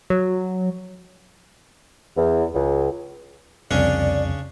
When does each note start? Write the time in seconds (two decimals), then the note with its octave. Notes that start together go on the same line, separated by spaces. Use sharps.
0.10 F#3
2.16 E2
2.54 C#2
3.71 C2 F2 C#3 C#4 D4 D5